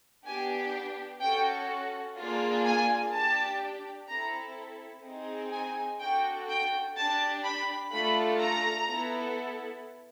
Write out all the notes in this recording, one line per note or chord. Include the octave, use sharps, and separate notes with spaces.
B3 D4 G4 G#5
C#4 F#4 A4 G5
A#3 D4 F4 G#4
G#5
D4 G4 A5
C4 E4 A4 A#5
C4 D#4 G#4
G#5
D4 F#4 A4 G5
G5
D4 G4 A5
B5
A3 D4 F4 A4 B5
A#5
B3 E4 A4